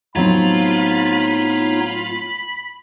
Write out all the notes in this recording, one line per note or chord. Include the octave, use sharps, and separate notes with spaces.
A2 F#3 B3 C4 D#4 F4 C#5 B5